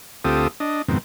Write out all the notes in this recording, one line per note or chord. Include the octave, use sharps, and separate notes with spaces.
D2 C4 F4 G4 A4 D#6
D4 D#5
F2 G#2 B2 D#3 C4